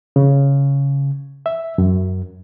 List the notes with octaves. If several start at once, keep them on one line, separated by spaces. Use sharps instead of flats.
C#3
E5
F#2